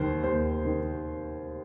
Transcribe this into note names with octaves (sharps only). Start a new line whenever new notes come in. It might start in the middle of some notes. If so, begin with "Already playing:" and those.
Already playing: D#2 D#3 C5
D#2 C5
D#3